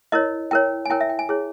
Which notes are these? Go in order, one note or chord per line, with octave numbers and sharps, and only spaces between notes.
E4 A#4 C#5 D#5
E4 A#4 C#5 G5
G#5
E4 A#4 C#5 G5
E5
G5
G#5
E4 G#4 C#5